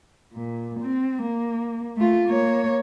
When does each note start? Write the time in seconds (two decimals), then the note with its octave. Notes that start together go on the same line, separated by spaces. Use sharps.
0.33 A#2
0.80 C4
1.23 A#3
1.97 A3 F4
2.28 A#3 C#5